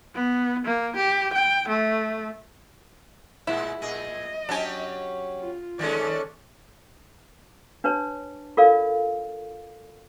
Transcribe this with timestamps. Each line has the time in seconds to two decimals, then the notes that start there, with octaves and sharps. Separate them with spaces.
0.15 B3
0.65 A#3
0.96 G4
1.34 G5
1.69 A3
3.47 A#2 G#3 E4
3.82 A#2 G#4 D#5
4.49 F#3 C#4 D4 G4 G#5
5.41 F4
5.79 D#3 G#3 C#4 A4 D5
7.84 D4 B4 C#5 A5
8.57 F4 A4 A#4 D5 F5